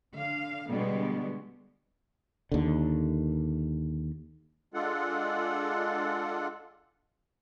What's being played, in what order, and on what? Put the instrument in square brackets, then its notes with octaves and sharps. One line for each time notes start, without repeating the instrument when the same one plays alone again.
[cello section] D3 F5
B2 D3 G3 G#3 B3
[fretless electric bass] D#2 D3
[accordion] G#3 D4 F4 A4 F#5